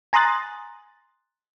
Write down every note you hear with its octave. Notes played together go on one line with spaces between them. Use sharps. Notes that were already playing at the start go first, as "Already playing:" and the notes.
G#5 A#5 C6 D#6 F#6 A6